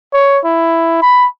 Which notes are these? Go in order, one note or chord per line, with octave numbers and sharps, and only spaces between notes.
C#5
E4
B5